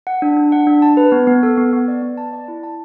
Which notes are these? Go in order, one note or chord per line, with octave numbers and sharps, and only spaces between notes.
F#5
D4
D4
F#5
D4
A5
B4
B3
B3
A4
B3
B3
D5
B3
A5
D5
E4
A5